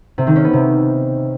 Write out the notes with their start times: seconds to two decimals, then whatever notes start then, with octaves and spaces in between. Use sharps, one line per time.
0.18 C3
0.27 D#3
0.36 C#4
0.44 B3
0.53 C3